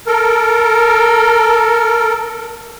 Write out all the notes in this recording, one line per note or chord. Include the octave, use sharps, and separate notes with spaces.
A4 A#4